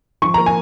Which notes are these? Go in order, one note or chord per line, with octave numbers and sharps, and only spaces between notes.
F3 C#6
A#3 A#5
G#5